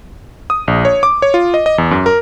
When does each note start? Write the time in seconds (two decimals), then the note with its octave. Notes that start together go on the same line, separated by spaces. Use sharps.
0.50 D#6
0.68 A#1
0.85 C#5
1.03 D6
1.22 C#5
1.34 F4
1.54 D#5
1.66 D#5
1.78 E2
1.91 F#2
2.06 A#4